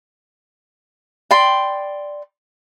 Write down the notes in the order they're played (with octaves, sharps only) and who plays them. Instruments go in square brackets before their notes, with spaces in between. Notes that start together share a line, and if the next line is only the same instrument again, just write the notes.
[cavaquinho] D5 G5 B5 C6